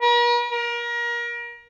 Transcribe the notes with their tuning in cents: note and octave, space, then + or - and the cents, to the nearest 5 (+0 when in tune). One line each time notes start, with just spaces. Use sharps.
A#4 +45
A#4 +30